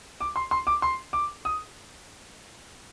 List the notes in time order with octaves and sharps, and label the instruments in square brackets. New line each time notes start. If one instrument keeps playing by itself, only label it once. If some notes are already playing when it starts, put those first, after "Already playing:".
[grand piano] D6
C6
C6
D6
C6
D6
D#6